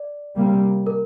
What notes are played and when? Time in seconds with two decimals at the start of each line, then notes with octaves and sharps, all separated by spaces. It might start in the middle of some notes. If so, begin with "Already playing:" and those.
Already playing: D5
0.35 C3 G3 A#3
0.87 A#4